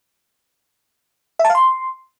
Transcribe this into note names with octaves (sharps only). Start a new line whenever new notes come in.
E5
A5
F5
C6